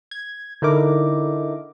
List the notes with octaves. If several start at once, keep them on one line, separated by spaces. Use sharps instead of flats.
G#6
D3 D#4 E4 A#4 D6